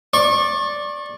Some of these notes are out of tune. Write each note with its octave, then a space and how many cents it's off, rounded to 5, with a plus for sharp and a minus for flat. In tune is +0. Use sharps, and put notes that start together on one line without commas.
D5 +0 C#6 -30